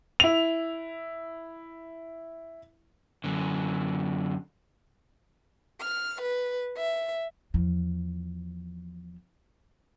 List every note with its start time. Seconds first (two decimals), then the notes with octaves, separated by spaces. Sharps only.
0.20 E4 F7
3.24 F#2 D3
5.81 F6
6.22 B4
6.77 E5
7.54 E2 F3